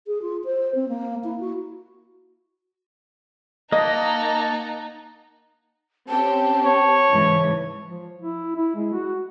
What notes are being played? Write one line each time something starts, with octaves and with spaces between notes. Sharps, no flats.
G#4
F4
C5
C4
A#3
E4
F#4
A#3 D#4 D#5 F#5 A5
C4 C#4 G4 A5
C#5
G#2 C#3 E3
F3
E4
E4
G#3
F#4